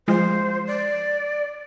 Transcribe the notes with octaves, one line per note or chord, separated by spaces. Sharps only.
F3 G#3 F4 C5
D5